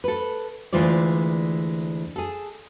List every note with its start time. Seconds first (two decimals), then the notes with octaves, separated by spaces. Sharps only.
0.04 A4 B4
0.73 D2 E3 G#3 F4 C5 D5
2.16 G#4 A4